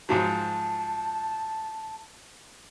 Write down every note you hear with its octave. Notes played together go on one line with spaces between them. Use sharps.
G#2 F3 F#3 A5